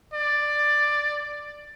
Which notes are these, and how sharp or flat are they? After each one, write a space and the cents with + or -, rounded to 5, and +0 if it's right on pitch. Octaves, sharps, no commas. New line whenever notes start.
D5 +10